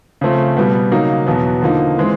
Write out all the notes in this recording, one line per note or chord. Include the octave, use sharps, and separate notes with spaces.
C#3 F3 A3 C4
B2 G3 B3
C#3 F#3 A#3 D#4
E2 B2 F#3 B3
D3 F3 A#3 D#4
E3 G#3 C4